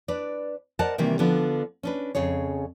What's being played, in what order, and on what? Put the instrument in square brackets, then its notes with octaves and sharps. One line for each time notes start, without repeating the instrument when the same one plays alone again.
[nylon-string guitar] D4 B4 D5
A#4 C5 D5 D#5 F#5 A5
C3 D#3 E3 G3 A#3
D3 F3 B3 D4
C#4 D4 B4
F2 C#3 G#4 C#5